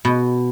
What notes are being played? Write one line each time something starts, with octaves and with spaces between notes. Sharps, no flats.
B2